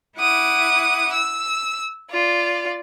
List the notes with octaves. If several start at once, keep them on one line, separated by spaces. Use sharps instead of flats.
E4 F#5 D6 D#6
E6
F4 D5